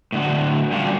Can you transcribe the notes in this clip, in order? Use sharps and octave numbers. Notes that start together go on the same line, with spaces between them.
A2 D3 F#4
F#3 G3 A#3 C#4 D4 F4